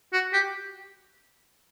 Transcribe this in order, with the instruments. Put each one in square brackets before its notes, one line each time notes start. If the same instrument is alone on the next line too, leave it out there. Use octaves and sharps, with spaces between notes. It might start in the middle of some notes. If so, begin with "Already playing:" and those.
[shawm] F#4
G4